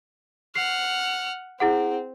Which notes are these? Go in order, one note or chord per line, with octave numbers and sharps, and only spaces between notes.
F#5 F6 C7
C4 E4 G#4 F#5